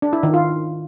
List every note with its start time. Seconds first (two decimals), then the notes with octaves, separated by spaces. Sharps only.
0.02 D4
0.13 E4
0.23 D#3
0.34 F4